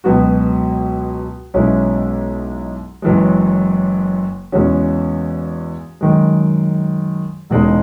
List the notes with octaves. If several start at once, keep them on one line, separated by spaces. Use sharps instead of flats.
C#2 B2 F#3 B3 F#4
B1 B2 G#3 C#4 E4
F#1 F#2 E3 G#3
E2 C#3 G#3 C#4 F#4
F#2 D#3 G#3
E1 E2 C#3 G#3 D#4